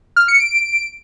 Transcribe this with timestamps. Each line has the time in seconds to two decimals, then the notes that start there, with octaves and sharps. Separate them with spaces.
0.16 F6
0.28 C#7
0.40 D7